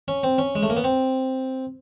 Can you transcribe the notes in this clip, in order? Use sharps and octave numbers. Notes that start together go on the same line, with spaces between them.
C#4
C4
C#4
G#3
A3
A#3
B3
C4